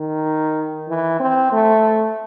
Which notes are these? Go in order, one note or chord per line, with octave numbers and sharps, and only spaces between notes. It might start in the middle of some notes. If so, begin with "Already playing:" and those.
Already playing: D#3
E3
C4
A3